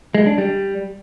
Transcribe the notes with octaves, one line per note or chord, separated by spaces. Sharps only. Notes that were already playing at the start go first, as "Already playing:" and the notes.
G#3
D4
G3